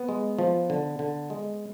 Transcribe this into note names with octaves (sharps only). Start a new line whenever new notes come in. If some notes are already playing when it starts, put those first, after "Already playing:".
Already playing: B3
G#3
F3
D3
D3
G#3